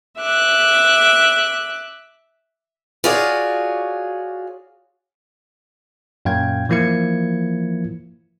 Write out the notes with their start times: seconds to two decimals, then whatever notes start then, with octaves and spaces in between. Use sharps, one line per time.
0.20 E5 D6 F#6
3.04 F4 F#4 G#4 C#5 D5
6.25 F#2 A#2 F5 G5 G#6
6.69 E3 F3 A#3 E4 G#6 C#7